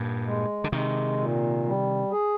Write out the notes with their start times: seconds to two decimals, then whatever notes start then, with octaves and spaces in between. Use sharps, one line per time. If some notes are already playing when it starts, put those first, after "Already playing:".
Already playing: G2 A#2
0.26 G#3
0.64 D3
0.72 C3 D#3 G#3
1.19 A#2
1.65 G3
2.12 G#4